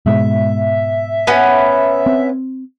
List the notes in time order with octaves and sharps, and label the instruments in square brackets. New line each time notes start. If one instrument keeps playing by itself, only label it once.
[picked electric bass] G#2 B2 G#3 [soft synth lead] E5
[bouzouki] B3 C#4
[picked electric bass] C4